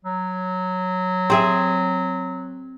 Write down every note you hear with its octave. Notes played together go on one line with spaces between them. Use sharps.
F#3
C4 G#4 E5